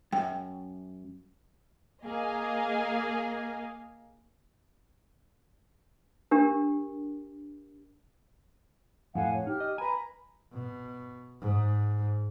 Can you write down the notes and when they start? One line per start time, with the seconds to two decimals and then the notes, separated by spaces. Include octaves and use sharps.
0.12 F#2 G5
2.05 A#3 G#4 D#5 F5 G#5
6.31 D4 G4 A#4
9.15 F2 A2 A4 F5 F#5 G#5
9.34 C#5
9.47 D#4 G4 F6
9.60 D#5
9.78 B4 G#5 A#5 B5
10.53 B2
11.41 G#2